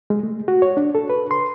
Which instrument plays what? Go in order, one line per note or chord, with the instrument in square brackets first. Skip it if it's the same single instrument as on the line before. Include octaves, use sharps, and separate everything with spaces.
[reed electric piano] G#3
A3
F#4
C#5
D4
A4
B4
C6